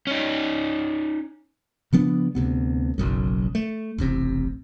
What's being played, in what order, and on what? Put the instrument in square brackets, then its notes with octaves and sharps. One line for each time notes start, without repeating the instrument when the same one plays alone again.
[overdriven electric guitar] C#4 D#4
[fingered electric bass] C#3 F3 B3 D4
D2 C3 B3
F#1 B1 F#2
A3
E1 A1 C3